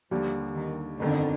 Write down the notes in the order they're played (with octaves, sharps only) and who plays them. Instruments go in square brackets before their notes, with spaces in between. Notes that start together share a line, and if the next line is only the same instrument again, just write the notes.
[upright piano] D#2 D3 G3 [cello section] F3
[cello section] D#3
[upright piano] G1 F2 D#3 [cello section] D3